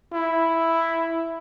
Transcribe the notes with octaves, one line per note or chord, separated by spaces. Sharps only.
E4